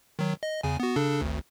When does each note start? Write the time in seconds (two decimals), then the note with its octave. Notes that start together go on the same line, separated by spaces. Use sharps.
0.19 D#3 F#3
0.43 D#5
0.63 E2 C#3 G#5
0.80 B3 F#4
0.96 C#3 D4 A4
1.21 G#1 D2